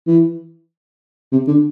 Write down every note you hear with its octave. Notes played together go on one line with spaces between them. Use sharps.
E3
C3
D3